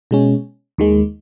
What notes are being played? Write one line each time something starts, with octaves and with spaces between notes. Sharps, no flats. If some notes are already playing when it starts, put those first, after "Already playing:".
B2 G#3 C#4
D#2 D#3 G#3